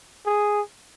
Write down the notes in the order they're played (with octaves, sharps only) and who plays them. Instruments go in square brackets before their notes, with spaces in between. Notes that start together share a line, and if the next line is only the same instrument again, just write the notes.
[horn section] G#4